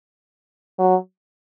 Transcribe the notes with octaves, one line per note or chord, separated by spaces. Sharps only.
F#3